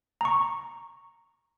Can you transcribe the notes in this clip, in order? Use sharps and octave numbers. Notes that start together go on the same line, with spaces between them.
A#5 C#6